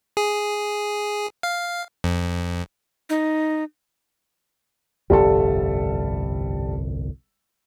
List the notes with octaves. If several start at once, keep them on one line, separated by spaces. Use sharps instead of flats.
G#4
F5
F2
D#4
G1 C2 F2 G3 A4